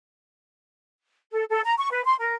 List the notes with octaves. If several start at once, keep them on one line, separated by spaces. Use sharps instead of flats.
A4
A4
A#5
C#6
B4
C6
A#4